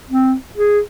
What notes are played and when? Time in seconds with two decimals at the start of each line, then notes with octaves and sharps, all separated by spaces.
0.10 C4
0.56 G#4